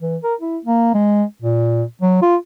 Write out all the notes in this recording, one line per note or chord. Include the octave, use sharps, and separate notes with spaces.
E3
A#4
E4
A#3
G#3
A#2
F#3
F4